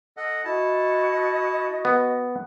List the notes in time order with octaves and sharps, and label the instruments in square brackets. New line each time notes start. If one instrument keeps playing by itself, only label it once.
[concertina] A4 D#5 F#5
[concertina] E4 A5 [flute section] F#4 D#5
[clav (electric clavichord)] B3